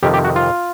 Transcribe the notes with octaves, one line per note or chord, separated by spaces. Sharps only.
F2 C3 D#3 G4
G4
F#4
F4